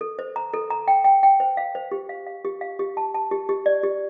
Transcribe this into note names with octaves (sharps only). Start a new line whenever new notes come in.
A4
C5
A#5
A4
A#5
G5
G5
G5
C5
F5
C5
G4
F5
F5
G4
F5
G4
A5
A5
G4
G4
D5
G4